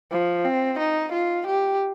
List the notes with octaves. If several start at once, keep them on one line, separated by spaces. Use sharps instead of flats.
F3
C4
D#4
F4
G4